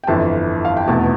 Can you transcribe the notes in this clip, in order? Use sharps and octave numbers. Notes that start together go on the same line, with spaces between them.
G5
G1 F2 E3 A5
F5
G5
F1 E2 B2 A3 A5